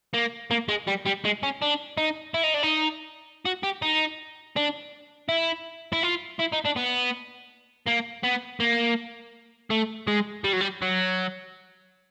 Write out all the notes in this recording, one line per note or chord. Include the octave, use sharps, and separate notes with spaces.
A#3
A#3
G#3
G3
G3
G#3
C#4
D4
D#4
E4
D#4
D4
D#4
F#4
G4
D#4
D4
E4
E4
F4
E4
D#4
D4
B3
A#3
B3
A#3
A3
G#3
G3
F#3
G3
F#3